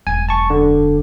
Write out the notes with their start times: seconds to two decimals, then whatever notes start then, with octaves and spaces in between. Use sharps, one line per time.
0.07 E1 F#2 G#5
0.29 A5 C#6
0.50 D3